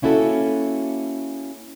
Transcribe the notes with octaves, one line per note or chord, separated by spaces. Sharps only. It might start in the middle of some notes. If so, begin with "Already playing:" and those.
A#3 C#4 E4 F#4 A4